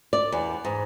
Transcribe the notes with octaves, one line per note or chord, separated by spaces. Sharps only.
D5
E2
G#2